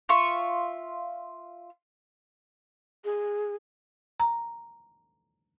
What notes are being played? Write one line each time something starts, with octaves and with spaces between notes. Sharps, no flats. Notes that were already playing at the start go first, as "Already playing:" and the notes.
F4 E5 C#6
G#4
A#5